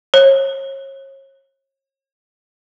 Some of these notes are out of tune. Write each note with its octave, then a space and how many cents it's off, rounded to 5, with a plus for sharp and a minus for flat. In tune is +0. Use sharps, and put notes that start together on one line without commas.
C#5 -40